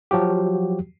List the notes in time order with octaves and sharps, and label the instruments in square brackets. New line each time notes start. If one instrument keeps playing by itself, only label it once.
[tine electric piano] F3 F#3 F#4 G4